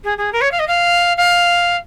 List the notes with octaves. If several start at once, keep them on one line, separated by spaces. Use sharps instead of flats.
G#4
G#4
A#4
C#5
F5
D#5
F5
F5